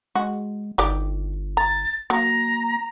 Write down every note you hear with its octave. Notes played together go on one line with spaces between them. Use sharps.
G#3 F#4
G1 D#3 G4 D5
A#5 A6
F#3 A#3 A#5